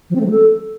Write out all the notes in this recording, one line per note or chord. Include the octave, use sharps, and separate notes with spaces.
F3
C4
A3
F#3
A4